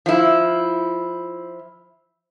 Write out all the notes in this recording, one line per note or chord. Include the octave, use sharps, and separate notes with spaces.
F3 E4